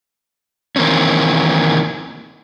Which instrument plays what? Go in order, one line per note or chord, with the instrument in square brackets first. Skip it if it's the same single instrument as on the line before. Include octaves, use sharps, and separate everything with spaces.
[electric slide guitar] D#3 E3 A#3 C4 C#4